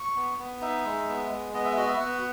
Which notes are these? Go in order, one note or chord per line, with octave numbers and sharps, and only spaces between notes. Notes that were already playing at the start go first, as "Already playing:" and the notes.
Already playing: C#6
B3
B3
D#4 E5
G#3
B3
G#3
B3 D#5
E5
F#4 D#5
E5
B3 F#5